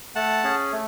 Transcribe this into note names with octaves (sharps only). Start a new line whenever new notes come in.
A3 F#5 A5
C#4 G#4
A3